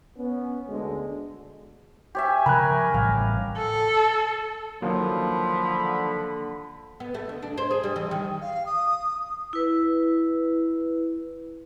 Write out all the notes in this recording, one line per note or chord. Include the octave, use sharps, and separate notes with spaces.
B3 C#4
D2 D3 G#3
G4 C#5 E5 G#5
C#3 F3 A#4 B5 F#6
A1 A2 G3 F5
A4
D3 D#3 F3 F#3 A#3 B5
B3
A3
D2
D4
C5
G#4
G3
E3
D#3
F5
D#6
E4 B4